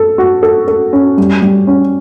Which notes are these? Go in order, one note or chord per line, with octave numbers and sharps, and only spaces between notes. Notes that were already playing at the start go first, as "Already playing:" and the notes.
Already playing: A4
F#4
A4
A4
C#4
G3
G3
C#4